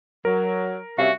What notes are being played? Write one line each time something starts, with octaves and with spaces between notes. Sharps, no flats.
F#3 A#4
C3 G3 C#4 F#4 E5 F5